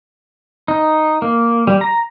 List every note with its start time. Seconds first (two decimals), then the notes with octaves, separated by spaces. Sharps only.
0.68 D#4
1.22 A#3
1.67 G3
1.81 A#5